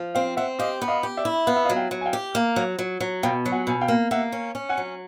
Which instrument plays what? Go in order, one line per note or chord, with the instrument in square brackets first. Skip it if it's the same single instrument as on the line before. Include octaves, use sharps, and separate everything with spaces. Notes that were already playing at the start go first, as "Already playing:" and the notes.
Already playing: [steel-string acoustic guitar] F3
[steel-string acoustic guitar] C4 [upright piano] F5 G5
[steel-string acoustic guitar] C4 [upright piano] E5 F#5
[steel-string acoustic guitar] G4 [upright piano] D#5 F5
[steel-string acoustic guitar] B3
[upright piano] D#5 F5
[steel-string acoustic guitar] G4
[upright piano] D5 E5
[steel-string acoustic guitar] E4
[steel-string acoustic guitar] B3 [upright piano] F5
[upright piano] E5
D#5 F5
[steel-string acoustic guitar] F#3
[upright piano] F5 G5
[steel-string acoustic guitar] F#3
[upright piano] G#5
F5 G5
[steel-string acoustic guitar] G4
A#3
F#3
F#3
F#3
[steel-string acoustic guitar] B2 [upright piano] F5 G5
[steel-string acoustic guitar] F#3
[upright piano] F#5 G#5
[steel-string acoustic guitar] B2 [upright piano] G#5
[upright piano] F5 G5
[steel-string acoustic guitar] A#3
[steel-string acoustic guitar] A#3 [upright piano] E5 F#5
[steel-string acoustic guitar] C#4
C#4
[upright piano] F#5 G#5
[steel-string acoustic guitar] F#3